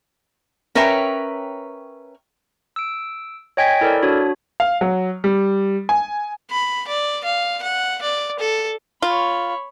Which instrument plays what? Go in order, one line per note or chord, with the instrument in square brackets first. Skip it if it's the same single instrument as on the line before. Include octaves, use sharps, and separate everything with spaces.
[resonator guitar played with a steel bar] C#4 A#4 B4 C#5 E5 G5
[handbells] E6 D7
C#5 D#5 G5 G#5 G#6 B6
E4 A4 A#4 C5 D5
D4 F#4 C#5
[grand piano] F5
F#3
G3
G#5
[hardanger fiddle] B5
D5
F5
F#5
D5
A4
[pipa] F4 [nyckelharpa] C#5 B5